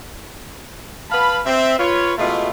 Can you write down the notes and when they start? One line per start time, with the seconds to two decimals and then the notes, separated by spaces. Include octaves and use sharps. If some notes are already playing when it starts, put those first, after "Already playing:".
1.11 B4 F5 A5 B5
1.45 C4 E5
1.78 F4 B4 C#5
2.18 B2 G#3 A3 E4 F4